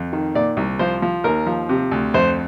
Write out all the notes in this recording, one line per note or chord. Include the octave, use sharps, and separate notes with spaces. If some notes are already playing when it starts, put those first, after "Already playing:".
Already playing: F2
D#3
A#2 D5
C2
F3 C5
F3
D#2 A#4
F3
C3
D2
F2 C5